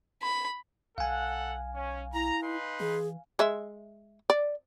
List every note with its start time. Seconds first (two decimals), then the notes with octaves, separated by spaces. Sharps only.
0.22 B5
0.98 B1 A4 F5 F#5 G#5
1.75 C#4
2.13 E4 A#5
2.43 D#4 B4 C6
2.80 E3 G#4
3.39 G#3 E5
4.30 D5